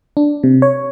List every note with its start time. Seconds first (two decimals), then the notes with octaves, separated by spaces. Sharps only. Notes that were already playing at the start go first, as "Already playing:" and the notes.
0.17 D4
0.43 C3
0.62 C#5